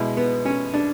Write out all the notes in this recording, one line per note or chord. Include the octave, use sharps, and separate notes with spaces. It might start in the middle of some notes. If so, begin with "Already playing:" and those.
Already playing: B2 G#3 E4
B3
C#4
D4